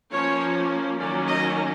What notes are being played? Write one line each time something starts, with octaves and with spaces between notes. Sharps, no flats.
F3 A#3 C#4 C#5
D#3 F#3 A#3 C#4 D5
D#5